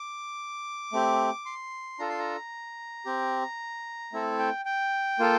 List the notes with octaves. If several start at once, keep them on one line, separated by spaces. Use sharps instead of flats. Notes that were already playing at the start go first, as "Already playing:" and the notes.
Already playing: D6
A3 C4 G4
C6
D4 F4 A4 A#5
C6
A#5
C4 G4
A3 C4 E4 A4
G5
G5
A#3 F4 A4